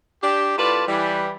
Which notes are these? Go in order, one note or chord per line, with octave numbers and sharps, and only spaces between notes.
D4 G4
A2 F4 B4 D5 A5
E3 G3